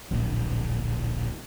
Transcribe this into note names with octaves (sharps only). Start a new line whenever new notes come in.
D1 A#1